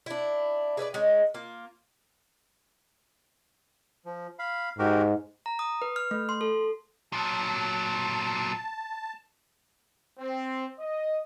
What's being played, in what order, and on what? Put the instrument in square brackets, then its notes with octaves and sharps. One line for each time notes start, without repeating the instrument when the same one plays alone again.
[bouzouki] D4 E4
G#4 B4 C#5 D5
G#3 C#4 D#4
A#3 F4
[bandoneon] F3
F5 B5
[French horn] G#2 [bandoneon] F#4 G4 A#4
[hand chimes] A#5
D#6
B4
F6
A3
C6
A4
[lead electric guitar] A#2 F#3 [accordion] A5
[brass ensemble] C4
D#5